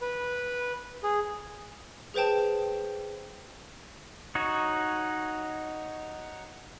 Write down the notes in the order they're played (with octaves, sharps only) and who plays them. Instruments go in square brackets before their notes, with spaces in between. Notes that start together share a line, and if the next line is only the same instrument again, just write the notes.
[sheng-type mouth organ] B4
G#4
[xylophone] G#4 B4 C5 G5 A5
[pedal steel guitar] D#4 F#4 C#5